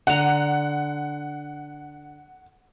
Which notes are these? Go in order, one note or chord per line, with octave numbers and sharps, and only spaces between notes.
D3 F#5 A#5